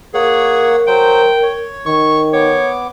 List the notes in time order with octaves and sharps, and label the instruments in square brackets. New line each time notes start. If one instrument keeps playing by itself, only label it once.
[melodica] A#3 C#5 F#5 [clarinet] G#4 [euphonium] A#4
[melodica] F#3 C5 [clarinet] G5
[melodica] C#5
[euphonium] D#3 [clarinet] C#6
[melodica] B3 D6 [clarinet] C#5